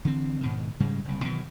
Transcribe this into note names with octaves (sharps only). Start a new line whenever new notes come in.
D3 E3 C4
G#2 B2 D#3
G#2 C#3 G3 G#3
F#1 C2
B2 D#3 E3 F#3